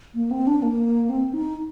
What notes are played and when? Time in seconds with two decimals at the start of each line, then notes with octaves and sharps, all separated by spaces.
0.15 A#3
0.31 C4
0.47 D4
0.62 A#3
1.10 C4
1.33 D#4